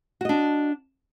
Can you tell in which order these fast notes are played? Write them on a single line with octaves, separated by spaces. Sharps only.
F#4 D#5 D4